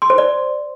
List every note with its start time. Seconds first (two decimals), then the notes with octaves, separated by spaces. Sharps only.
0.02 C6
0.10 C5
0.18 D5